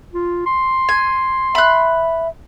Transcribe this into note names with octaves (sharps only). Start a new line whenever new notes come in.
F4
C6
G#5
E5 B5 F#6